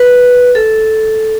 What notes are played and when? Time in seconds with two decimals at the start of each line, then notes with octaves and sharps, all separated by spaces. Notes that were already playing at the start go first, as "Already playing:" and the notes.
Already playing: B4
0.55 A4